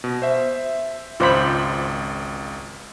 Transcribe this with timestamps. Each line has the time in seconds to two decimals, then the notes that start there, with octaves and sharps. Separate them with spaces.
0.04 B2
0.22 C5 E5
1.20 G#1 C#2 F4 C5 B5 D6